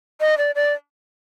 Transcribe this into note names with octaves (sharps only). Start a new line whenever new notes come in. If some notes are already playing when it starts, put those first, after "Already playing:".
D#5
D5
D5